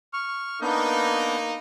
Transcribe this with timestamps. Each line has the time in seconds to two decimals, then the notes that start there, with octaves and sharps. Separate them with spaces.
0.13 C#6 F6
0.62 A#3 B3 D4 D#4 G6